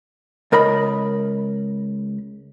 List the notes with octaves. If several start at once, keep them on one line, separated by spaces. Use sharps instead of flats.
C#2 A#4 D#5 B5